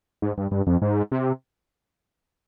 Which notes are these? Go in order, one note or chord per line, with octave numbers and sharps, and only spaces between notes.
G#2
G2
G2
F2
G#2
C3